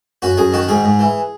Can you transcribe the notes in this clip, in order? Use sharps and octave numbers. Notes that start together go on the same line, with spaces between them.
F#2 F#4
F#2 G#4
D#3 F#4
G#2 G#4
G#2
E3